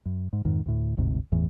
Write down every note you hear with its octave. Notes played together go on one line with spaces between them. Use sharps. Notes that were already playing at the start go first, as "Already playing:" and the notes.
F#2
G#2
F2 G#2 D#3
D2 A2
G1 D2 G#2 C3
G1 E2 A2 E3